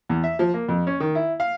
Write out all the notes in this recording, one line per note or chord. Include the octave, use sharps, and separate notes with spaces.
E2
E5
F3
A#3
F2
C#4
D#3
E4
F5